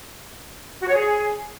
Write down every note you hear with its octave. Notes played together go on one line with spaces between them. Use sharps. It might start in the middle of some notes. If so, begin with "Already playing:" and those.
F#4
C#5
G#4